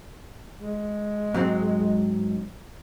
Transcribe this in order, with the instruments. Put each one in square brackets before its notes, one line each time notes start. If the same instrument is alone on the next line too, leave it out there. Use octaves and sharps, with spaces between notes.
[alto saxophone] G#3
[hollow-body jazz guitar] G#2 F#3 C4